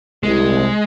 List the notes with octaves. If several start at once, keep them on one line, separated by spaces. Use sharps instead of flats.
C2 G#3